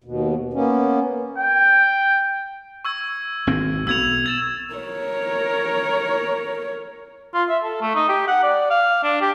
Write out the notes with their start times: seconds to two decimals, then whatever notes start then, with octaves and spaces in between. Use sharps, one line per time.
0.04 D#2 B2
0.54 A#3 B3 C#4
1.38 G5
2.85 C#6 E6 G#6
3.47 G#1 B2 C4
3.87 B1 B3 E6 G#6 F7
4.26 G#6 A6 E7
4.74 A#4 C#5
7.34 F4
7.49 E5
7.64 A4
7.81 A3
7.95 D#4
8.09 G4
8.28 F#5
8.43 D5
8.70 F5
9.03 D4
9.21 G4